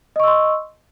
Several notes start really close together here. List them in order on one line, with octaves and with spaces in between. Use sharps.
D#5 C#6 E6 C6